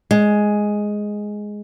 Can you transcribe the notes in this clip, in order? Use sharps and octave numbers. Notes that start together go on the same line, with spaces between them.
G#3